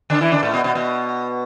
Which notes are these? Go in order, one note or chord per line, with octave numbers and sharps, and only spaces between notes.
D3 D4
E3 E4
D3 D4
A2 A3
B2 B3
B2 B3
B2 B3